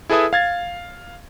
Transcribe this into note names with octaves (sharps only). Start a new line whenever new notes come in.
E4 G#4 A4 B4 E5 D#6
F5 G#6 A6